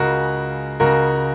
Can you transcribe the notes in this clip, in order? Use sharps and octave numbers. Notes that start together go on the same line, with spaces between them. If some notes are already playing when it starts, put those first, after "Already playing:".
Already playing: C#2 C#3 G#3 F#4 A#4
C#2 C#3 G#3 F#4 A#4